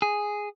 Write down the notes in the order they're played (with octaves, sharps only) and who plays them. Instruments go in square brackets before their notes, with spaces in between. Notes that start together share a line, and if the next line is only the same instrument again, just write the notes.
[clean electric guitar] G#4